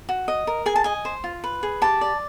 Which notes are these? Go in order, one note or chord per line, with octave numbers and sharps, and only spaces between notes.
F#4
D#5
A#4
G#4 G#5
A5
D#5 G#5
C5
F4
B4
G#4
G4 A5
D5